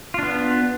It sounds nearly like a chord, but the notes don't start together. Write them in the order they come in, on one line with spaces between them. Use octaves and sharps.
F4 D4 B3